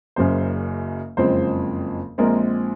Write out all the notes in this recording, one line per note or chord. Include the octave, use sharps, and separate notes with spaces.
F#1 F#2 C#3 C5
F#1 F2 C#3 G#3 C4 C5
A#1 A#2 G#3 C4 A#4